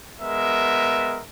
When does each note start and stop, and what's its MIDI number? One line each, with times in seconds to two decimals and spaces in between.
0.22 1.22 56
0.22 1.22 59
0.22 1.22 70
0.22 1.22 76